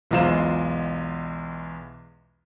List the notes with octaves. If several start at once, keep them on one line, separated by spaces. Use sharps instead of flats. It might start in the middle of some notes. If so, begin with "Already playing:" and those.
B1 E2 G#3 F4 C5 E7